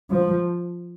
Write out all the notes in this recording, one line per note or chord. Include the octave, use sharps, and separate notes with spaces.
F3